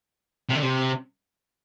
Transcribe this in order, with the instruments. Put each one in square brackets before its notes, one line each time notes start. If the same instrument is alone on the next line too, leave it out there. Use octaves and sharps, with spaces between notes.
[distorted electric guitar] C3
D3
C3